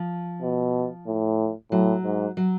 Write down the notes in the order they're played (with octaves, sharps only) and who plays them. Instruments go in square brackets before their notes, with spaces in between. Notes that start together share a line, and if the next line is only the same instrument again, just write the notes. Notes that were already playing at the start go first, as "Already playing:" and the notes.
Already playing: [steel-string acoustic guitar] F3
[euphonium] B2
A2
[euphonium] A2 [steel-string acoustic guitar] F#3
[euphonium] G#2
[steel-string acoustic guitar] F#3